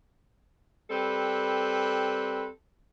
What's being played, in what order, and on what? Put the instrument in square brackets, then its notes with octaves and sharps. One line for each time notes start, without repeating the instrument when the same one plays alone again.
[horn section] G3 C4 A4 B4